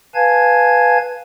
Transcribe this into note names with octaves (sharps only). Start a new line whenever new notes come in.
B4 F5 G#5 A5 G#6